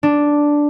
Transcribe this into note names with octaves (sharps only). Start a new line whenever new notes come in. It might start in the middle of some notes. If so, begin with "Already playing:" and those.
D4